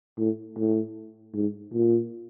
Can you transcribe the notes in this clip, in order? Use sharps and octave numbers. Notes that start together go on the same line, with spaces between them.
A2
A2
G#2
A#2